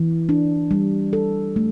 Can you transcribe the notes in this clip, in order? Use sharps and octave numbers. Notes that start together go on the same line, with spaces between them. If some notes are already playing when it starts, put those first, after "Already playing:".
Already playing: E3
D4
G3
A4
A3